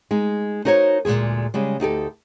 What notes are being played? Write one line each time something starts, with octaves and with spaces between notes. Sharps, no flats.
G#3 D#4
D#4 F#4 A#4 C5 C#5
D2 A#2 F3 G#3 G#4
C#3 G3 G#3
D2 D#4 G4 A4